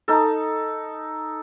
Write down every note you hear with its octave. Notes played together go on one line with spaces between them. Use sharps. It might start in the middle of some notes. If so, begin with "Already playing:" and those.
D#4 A4